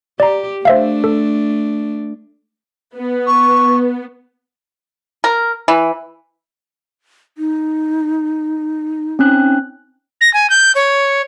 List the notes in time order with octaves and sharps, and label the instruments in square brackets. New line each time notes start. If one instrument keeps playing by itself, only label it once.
[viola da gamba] G4 [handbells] D5 A#5
[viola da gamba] A3 D4 [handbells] C5 E5 F5
[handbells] A4
[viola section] B3
[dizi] C#6
[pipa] A#4
E3
[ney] D#4
[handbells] C4 C#4 F#6
[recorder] A#6
G#5
G6
C#5